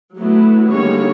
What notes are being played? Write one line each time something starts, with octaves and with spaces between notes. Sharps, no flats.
F#3 A3 B3 E4
D3 D#3 G3 A#3 G#4 C#5